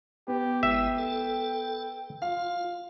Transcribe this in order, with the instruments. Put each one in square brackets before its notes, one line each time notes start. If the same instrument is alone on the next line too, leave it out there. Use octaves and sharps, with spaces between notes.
[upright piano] B3 [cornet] G4
[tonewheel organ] G1 G#3 E4 [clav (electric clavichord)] E5 [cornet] G5
[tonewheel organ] A4
[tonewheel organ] F4 [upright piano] F5